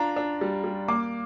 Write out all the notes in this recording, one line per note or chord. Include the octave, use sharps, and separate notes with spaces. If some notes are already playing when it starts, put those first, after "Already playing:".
Already playing: D4 F4 A#5
D4
G3
G3
A#3 D6